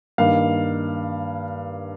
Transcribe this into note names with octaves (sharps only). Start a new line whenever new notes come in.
G2 D#3 A#3 F5